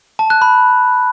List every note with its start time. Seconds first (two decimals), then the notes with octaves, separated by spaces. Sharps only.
0.19 A5
0.30 F#6
0.42 B5